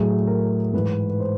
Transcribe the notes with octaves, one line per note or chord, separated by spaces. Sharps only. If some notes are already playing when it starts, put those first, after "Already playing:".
Already playing: A2 F#3 G#4
A#4
G#2 E3 B4
B4
C5